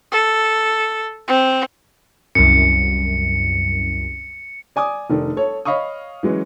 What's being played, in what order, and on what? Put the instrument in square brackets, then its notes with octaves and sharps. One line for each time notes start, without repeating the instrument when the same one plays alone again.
[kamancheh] A4
C4
[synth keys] C2 F#2 [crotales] C#7
[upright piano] D5 G#5 D6 D#6
F1 D#3 D4 A4
A4 C#5
C#5 D#5 F5 B5 C#6 D#6
E3 F#3 G#3 C#4